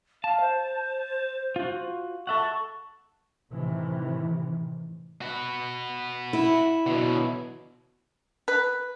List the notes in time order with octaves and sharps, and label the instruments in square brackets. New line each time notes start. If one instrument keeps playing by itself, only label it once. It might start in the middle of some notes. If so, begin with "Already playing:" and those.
[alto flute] F5 [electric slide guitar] A5
[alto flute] C5
[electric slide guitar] F4 F#4
[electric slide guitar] A4 E5 F#5 [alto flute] C#6
[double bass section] A2 C3 D#3 E3
[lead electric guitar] F#4 B4
[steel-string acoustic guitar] E4
[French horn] B2 [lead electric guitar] D3 F#3
[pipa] B4